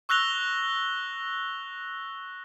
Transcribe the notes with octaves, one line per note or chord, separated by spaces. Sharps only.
C#6 E6 F#6 A#6 F7 G7